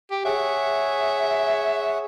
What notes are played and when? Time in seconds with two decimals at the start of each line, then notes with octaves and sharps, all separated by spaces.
0.11 G4
0.25 G#4 C#5 E5 F#5